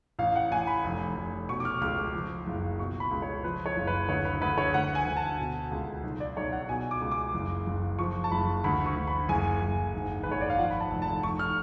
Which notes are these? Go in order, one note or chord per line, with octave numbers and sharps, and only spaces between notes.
A1 F5
F#5
A1 G#5
B5
F1
F1
B2 C#6
D6
F6
C#2 F6
D6
F3
F#1
B2 C#6
B5
C#2
C#5
F3 B4
C#5
F#1
B4
D2 C#5
B4
D2 B4
C#5
D2 F#5
G#5
D2
A5
B2
C#2
B1
D5
B1 C#5
F#5
B2 G#5
D6
C#2
D6
F#1
F#1
F3 C#6
A5
F#1 B5
D2 B5
C#6
D2
B5
F#1 G#5
F#1
G#1
G#1 B4
C#5
D5
F5
F3 F#5
B5
A5
F1
A5
F1 C#6
F6